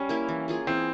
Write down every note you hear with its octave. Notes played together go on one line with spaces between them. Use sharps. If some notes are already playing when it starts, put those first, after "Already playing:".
Already playing: G3 C#4
A#3 E4 A#4
E3
A#3 F4 G#4
E3 C4